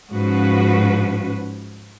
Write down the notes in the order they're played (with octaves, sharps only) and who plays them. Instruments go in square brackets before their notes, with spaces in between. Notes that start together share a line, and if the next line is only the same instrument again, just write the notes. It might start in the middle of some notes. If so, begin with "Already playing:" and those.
[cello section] G#2 F3 C#4 F#4 B4